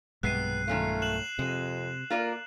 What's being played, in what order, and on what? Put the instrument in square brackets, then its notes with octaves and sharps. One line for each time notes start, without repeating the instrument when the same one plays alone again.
[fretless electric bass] B1 G2 G#3 [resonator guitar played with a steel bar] C3 B3 [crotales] F#6 C7 D#7
[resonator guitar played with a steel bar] D#3 C#4 F4 [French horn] A3
[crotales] F#6 E7 F#7
[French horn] F2 [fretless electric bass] C3 [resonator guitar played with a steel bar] G#3
[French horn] A#3 [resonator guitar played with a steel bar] F4 A#4 D5